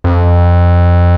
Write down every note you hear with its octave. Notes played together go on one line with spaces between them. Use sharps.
F2